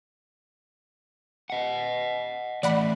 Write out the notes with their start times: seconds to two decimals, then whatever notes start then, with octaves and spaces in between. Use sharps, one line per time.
1.50 D#5 F#5
2.63 A2 E3 D5 F#5 B5